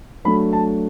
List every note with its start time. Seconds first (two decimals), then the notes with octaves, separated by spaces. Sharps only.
0.25 F#3 A3 D4 B5
0.53 A5